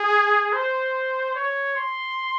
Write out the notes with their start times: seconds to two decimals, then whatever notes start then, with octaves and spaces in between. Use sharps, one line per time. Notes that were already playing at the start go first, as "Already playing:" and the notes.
Already playing: G#4
0.53 C5
1.35 C#5
1.76 C6